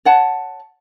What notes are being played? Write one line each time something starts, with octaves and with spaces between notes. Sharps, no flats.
C#5 F#5 A5